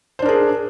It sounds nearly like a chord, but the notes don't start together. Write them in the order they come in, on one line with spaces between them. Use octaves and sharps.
C5 D4 A#4 G#4